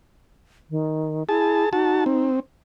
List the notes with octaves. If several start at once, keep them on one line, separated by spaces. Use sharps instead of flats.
D#3
E4 G#4 A5
D#4 F#4 A5
C4